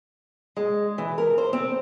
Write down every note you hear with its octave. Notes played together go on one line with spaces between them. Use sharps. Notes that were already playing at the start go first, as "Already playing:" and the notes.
G#3
E3
A#4
C5
C4